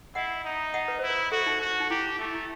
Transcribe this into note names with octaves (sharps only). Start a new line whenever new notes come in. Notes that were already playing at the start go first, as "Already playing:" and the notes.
E4 D#5 F#5
D#4
D#5 F#5
B4
E4 C5
B4
F#4 A4
D#4
F#4
D#4
E4 G4
A3 E4
E4